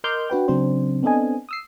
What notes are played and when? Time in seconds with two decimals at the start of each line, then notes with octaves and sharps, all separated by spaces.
0.04 A#4 D#5 C6 D6 F6 G6
0.30 D4 F#4 B4 G5
0.48 C#3 F#3 C4 D4 C5
1.03 B3 C4 D4 A4 D#5 G#5
1.49 D#6 E6 C7